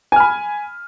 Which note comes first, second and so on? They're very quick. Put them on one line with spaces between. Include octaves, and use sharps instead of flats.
G#5 F6 B5